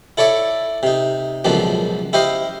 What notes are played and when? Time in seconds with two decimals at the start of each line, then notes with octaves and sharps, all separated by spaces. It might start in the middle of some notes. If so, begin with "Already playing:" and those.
0.17 E4 A4 C#5 D5 E5
0.83 C3 D#4
1.44 C#2 F#2 B2 D3 F3 A#3
2.13 E4 G4 C5 D#5 F5